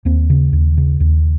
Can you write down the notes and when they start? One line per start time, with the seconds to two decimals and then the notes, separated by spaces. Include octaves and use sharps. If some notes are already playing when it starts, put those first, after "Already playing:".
0.05 D#2 A#3 C4
0.30 C#3
0.53 D#2
0.77 C#3
1.00 D#2